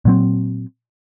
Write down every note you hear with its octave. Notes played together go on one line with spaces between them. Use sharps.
A#2 F#3 C4